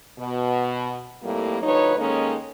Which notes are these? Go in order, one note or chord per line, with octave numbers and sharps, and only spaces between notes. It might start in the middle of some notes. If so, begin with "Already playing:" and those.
B2
F2 A2 G3 A#3
D2 F3 D#4 B4 C#5
D#3 G#3 A#3 C#4 D#4 A4